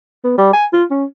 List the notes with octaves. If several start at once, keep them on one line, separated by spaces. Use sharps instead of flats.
B3
G3
G#5
F4
C#4